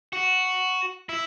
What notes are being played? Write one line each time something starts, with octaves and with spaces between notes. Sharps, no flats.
F#4
E4